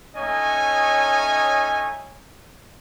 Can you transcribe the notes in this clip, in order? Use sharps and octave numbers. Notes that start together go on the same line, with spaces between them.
A3 C#4 D#4 C#5 D#5 G#5